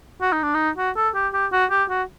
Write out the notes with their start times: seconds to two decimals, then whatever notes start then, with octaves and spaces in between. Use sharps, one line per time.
0.21 F#4
0.33 D#4
0.43 D4
0.55 D#4
0.77 F#4
0.96 A4
1.15 G4
1.34 G4
1.52 F#4
1.71 G4
1.90 F#4